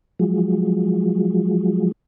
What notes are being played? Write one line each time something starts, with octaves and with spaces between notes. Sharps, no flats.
F3 F#3 G#3